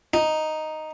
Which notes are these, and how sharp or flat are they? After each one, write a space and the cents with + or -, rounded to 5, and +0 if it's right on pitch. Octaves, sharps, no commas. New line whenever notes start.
D#4 +0